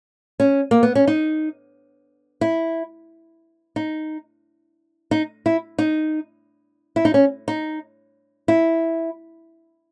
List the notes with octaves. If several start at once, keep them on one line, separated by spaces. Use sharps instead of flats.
C#4
A#3
B3
C#4
D#4
E4
D#4
D#4
E4
D#4
E4
D#4
C#4
D#4
E4